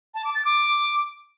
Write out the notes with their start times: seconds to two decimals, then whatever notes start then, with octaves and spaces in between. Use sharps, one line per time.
0.14 A5
0.25 D6
0.35 A6
0.45 D6